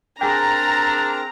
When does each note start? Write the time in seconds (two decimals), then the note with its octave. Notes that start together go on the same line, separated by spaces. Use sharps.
0.21 C4 D4 G#4 A#4 G5 A#5